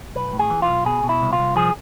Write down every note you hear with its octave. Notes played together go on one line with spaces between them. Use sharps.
B1 B4
A2
G#4
E3
F4
B1
B2 G#4
B2
E4
C2
F4
C2
F3 G#4